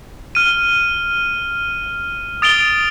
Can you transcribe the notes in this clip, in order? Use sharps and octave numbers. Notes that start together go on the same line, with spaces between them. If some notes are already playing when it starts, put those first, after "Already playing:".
F6 D#7
D#6 A6 D7 F7 G7